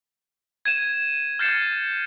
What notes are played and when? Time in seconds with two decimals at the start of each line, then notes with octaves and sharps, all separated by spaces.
0.65 G#6 D#7 E7
1.39 F6 G6 A6 C7 C#7 E7